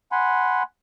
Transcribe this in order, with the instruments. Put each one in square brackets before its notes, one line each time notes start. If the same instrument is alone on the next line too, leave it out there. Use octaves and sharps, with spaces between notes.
[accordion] F#5 G#5 B5 C6